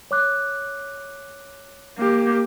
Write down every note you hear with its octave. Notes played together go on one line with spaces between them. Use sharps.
C#5 D6 F#6
A#3 G4